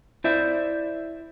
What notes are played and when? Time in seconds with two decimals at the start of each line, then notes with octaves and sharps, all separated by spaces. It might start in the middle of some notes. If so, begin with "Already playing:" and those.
0.24 E4 C5 D5 E5